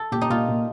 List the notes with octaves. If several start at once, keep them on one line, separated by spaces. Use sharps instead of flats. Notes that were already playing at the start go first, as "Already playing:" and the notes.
Already playing: A4
A#2 G4
D#4
A#2 F4
A#2